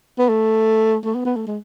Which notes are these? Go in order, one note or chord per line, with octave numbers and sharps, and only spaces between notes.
B3
A3
A3
B3
B3
A3
G#3